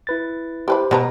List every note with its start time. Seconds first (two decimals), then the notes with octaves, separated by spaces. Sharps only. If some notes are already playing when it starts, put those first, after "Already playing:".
0.07 E4 B4 A6
0.68 E4 G4 B4 C5 B5
0.91 B2 B3 B4 A#5